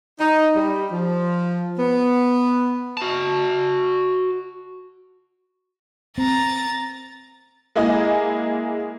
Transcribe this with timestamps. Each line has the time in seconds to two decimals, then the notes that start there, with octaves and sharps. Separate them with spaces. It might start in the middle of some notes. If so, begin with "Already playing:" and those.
0.19 D#4
0.55 G3
0.91 F3
1.78 B3
2.97 F#4 A5
6.18 C4 A#5 A6
7.76 G#3 A#3 E4 G#4 D#5